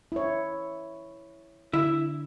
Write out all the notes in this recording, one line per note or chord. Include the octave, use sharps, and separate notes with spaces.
E4 C#5
D3 E4 E5